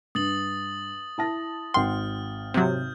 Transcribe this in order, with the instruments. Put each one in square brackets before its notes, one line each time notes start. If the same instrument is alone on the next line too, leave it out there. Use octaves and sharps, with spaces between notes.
[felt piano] G2 [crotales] D#6 A6 F#7
[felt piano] E4 A5 A#6
[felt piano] G#1 F#5 G5 [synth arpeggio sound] C6 [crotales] F6
[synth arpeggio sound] C3 F#3 [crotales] G6